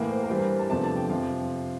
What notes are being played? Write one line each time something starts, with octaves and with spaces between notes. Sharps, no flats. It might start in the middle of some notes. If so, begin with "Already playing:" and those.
Already playing: A2 E3 A#3 A#4
C5
A#4
G2 E3 G3 C5
A#4
C5
A5
E2 C3 F3 A3 D4 A5
A5
G5
F2 C3 F3 F5